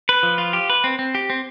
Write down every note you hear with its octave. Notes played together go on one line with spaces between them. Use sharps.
B4
F3
F4
G4
B4
C4
C4
G4
C4